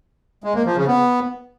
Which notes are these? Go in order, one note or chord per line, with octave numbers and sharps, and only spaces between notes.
G#3
A#3
F3
C#3
B3